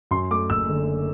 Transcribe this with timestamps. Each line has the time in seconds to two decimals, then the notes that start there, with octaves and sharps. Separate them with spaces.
0.11 F#2 C6
0.31 A3 D6
0.50 F#1 E6
0.69 D3